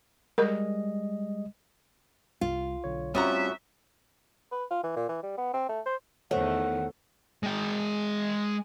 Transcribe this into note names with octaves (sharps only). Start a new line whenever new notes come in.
G3 G#3 A#4 D#5
C2 F4
B1 D3 C#5
A2 G3 C4 C#4 F4 F#4 E5 A#5
B4
F4
E3
A#2
E3
G3
B3
C4
A3
C5
E2 D#3 A3 C5 C#5 F#5
G#3 G5